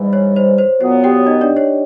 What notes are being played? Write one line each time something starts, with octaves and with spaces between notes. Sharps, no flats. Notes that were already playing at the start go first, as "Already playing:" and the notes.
Already playing: G#2 E3 G3
C#5
C5
C5
A#2 F#3 B3 C#5
G4 G5
D#4 D#5
D4 D5
C#5